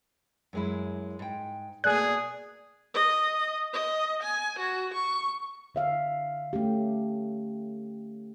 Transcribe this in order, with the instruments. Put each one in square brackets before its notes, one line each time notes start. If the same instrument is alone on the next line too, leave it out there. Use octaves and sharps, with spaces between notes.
[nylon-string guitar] F#2 G#3 E4
G#2 G5
[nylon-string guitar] B2 A3 A#3 [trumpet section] G#4 [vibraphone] D5 [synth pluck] F#6
[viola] D#5
D#5
G#5
F#4
C#6
[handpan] D3 E5 F5
A3 C#4 G4